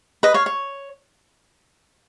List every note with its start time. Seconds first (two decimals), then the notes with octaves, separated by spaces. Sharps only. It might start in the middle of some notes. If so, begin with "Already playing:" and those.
0.23 B4 D#5
0.34 C#5 F5
0.46 C#5